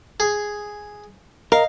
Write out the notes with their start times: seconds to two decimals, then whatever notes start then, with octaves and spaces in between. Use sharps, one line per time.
0.20 G#4
1.52 A#4 D#5 F5